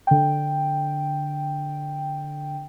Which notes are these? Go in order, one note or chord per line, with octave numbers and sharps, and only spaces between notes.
D3 G5